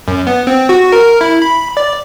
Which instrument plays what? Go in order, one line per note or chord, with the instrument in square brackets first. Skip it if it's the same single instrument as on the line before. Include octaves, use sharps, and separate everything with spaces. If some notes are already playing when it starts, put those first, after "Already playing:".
[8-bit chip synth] F#2
B3
C4
F#4
A#4
E4
B5
D5